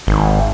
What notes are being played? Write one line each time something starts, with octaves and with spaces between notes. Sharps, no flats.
G#1